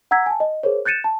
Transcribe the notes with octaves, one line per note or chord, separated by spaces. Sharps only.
F#5 A#5 E6 G#6 B6
G#5 A5
D#5
G#4 A#4 C5 C#5
F#6 G6 A6 C#7 D#7 E7
A5